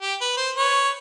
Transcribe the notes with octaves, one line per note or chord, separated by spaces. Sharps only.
G4
B4
C5
B4 C#5